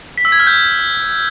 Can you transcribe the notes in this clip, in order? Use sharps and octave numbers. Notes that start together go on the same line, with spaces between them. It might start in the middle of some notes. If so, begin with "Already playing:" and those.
B6
E6
G#6
F6
G6